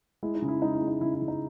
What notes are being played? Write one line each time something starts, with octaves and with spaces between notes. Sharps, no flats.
G#3 E4
D#4
C#3
E4
G#3 D#4
E4
G#3
D#4
C#3 E4
E4
C#3
D#4